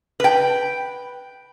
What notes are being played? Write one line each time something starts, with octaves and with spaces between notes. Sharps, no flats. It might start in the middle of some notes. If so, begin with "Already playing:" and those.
B4 G5